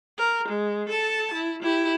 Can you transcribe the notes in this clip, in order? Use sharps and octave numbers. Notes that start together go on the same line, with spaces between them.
A#4
G#3
A4 A5
E4
E4 G4